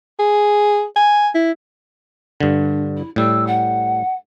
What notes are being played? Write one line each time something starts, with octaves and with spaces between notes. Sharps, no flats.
G#4
G#5
E4
G2 D3 D4
E4
A2 G3 E6
F#5